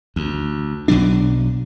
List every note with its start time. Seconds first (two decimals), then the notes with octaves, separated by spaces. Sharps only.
0.16 D2
0.88 B1 B2 F#3 D4